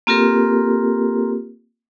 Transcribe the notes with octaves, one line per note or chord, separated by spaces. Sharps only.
A#3 C4 F4 G4 A4 A#4